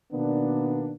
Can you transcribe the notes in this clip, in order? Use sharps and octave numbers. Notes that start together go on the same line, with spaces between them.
B2 D#3 A#3 B3 D4